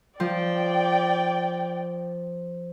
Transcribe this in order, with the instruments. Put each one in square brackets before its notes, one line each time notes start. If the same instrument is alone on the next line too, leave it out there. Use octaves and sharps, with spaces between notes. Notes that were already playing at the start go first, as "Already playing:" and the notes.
[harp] F3 [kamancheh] D5 G5